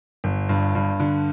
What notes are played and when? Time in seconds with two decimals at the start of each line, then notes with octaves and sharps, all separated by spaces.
0.24 G1
0.49 G2
0.75 G2
1.00 D3